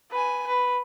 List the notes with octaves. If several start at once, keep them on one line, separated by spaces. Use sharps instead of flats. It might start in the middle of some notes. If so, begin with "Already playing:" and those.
B4 G#5
B4